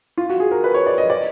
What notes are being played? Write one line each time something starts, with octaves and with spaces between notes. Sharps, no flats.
F4
F#4
G#4
A#4
B4
C#5
D5
D#5
D5